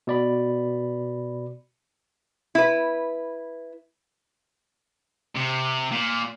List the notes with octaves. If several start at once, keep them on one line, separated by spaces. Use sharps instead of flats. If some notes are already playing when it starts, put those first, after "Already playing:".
B2 D5 B5
E4 B4
C3
A#2